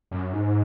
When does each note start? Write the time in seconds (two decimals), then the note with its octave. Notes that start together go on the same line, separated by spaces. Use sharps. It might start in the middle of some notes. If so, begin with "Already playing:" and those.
0.11 F#2
0.33 G#2